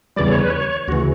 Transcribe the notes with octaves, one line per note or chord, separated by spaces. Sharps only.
E2 C#3 E3 G3 D5
C#5
B4
C#5
D2 C#3 E3 F#4